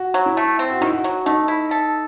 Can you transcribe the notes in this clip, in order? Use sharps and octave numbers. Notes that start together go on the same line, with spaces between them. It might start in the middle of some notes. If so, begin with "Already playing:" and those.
Already playing: F#4
F#3
E4
A3
C4
F#4
D#3 E4
F#4
F#3
A3 D#4
E4
A4